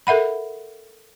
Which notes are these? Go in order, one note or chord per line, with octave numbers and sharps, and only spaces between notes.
A4 A#4 E5 F#5 B5